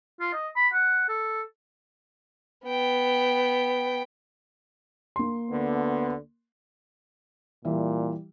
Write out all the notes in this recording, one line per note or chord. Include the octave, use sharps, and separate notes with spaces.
F4
D#5
B5
F#5
A4
B3 G5
A#3 C6
D2 D3 B3
A#2 E3 G3 E5